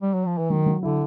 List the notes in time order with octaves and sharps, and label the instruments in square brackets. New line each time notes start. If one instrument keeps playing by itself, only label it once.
[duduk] G3
F#3
F3
E3
[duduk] D#3 [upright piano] F#3
[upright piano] F#3
[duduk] D3 [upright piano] E4